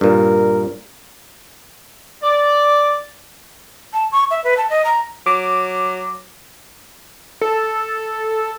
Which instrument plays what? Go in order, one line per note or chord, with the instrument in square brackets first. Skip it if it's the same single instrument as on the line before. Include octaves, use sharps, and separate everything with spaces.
[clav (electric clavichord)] G2 A#2 [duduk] A#4
[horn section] D5
[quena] A5
C#6
E5
B4
A5
D#5
A#5
[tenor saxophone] F#3 [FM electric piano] D6
[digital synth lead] A4